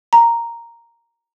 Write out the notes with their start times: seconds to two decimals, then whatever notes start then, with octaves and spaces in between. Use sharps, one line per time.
0.13 A#5